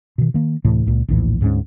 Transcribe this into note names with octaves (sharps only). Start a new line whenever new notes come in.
B2 D#3
D#3 A#3
D2 A2 C3 E3
C#2 A#2
A#1 D#2 A2 E3
D2 G#2 E3 C#4